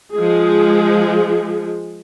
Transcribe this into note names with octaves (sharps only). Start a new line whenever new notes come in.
F3 G#3 G#4